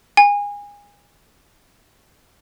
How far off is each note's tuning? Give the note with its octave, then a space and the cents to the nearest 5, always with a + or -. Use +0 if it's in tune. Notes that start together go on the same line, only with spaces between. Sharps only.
G#5 -25